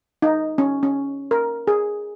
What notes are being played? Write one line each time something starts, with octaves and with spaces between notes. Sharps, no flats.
D#4
C#4
C#4
A#4
G#4